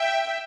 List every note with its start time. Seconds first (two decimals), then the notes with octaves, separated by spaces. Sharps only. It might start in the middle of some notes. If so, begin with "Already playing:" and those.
Already playing: E5 G5